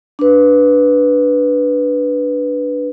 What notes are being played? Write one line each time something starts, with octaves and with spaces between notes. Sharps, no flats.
D4 B4